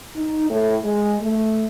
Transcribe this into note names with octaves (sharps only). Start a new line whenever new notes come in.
D#4
A2
G#3
A3